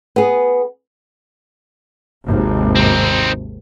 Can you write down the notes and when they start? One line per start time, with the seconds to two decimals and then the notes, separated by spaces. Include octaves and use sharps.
0.16 B3 G#4
2.25 G#1 D#2 C3
2.76 C4 D#4